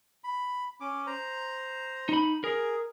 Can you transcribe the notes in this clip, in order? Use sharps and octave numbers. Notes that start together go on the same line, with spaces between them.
B5
C#4 D6
C5 A#5
D#4 B5
G#4 A#4